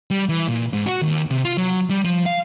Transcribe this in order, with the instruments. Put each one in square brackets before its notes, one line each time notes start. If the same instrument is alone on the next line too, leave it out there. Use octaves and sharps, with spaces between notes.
[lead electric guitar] G3
E3
A#2
G#2
F#4
D#2
C3
F4
F#3
G3
F3
F5